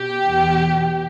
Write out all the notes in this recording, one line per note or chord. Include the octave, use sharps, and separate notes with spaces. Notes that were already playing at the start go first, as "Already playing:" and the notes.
Already playing: B2 G4
E2 B2